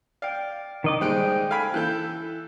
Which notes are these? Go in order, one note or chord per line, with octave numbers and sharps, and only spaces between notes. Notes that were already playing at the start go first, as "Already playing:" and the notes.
D5 F5 G5
D#3 D#5 D6
G3 G#3 D#4 C5 G5 F#6 D7
A4 F5 G#5 B5
E3 A4 F#6 G6